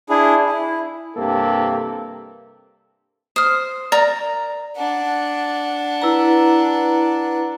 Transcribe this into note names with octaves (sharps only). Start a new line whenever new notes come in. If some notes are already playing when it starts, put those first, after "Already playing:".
D4 E4 G#4
E4
G2 C3 A#3 A4
C5 D#6 F6
A#4 D5 A#5
D4 F#5
E4 B4 A#5